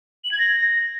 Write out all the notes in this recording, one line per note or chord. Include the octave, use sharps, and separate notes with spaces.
F#7
G#6
A#6